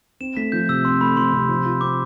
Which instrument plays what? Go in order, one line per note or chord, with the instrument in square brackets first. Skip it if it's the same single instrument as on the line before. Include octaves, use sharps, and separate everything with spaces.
[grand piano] C4 [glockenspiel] E7
[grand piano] A3 [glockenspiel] B6
[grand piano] F3 [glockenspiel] G6
[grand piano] C3 [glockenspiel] E6
[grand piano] C4 [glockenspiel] C6
[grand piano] A3 [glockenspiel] B5
[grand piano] F3 [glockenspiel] C6
[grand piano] C3
F3
F4
[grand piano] C4 [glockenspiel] D6